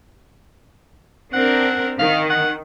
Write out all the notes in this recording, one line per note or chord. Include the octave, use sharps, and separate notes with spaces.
C4 D4 A#4 F#5
D#3 F5
F#5